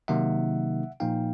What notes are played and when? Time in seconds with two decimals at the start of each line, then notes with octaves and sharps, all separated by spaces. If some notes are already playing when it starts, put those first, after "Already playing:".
0.08 C3 D#3 F#3 A#3 D#4 E5 F#5
1.00 A#2 F3 A#3 D#4 F5 G5